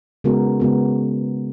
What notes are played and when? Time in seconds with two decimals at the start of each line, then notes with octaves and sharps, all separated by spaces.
0.24 C#3 G#3 B3 F#4 A#4
0.60 C#3 G#3 B3 F#4 A#4